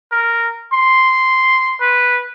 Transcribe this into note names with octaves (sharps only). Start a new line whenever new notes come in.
A#4
C6
B4